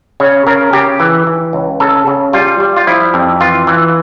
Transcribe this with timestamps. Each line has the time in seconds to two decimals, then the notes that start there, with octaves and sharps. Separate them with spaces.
0.20 C#3 C#5
0.47 C#3 A#4
0.73 C#3 G4
1.00 E3
1.27 E3
1.53 C#2
1.80 C#3 A4
2.07 C#3
2.33 G3 F4
2.60 G3
2.76 F4
2.87 F3 E4
3.14 F2
3.40 E3 F4
3.67 E3